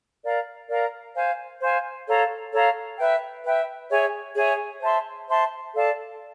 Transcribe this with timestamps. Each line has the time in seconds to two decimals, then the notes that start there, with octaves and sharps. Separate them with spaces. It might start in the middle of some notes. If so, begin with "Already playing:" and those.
0.24 A#4 D5 F5 A#5
0.69 A#4 D5 F5 A#5
1.15 C5 F5 G#5
1.61 C5 F5 G#5
2.07 A4 C#5 F5 A#5
2.53 A4 C#5 F5 A#5
2.98 B4 E5 G5
3.45 B4 E5 G5
3.91 G#4 C#5 E5 G#5
4.36 G#4 C#5 E5 G#5
4.82 C5 E5 A5 C6
5.29 C5 E5 A5 C6
5.74 A4 D5 F5 A5